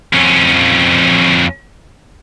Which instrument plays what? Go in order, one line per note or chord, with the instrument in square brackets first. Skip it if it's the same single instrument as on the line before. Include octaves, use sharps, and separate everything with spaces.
[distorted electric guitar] F2 C#4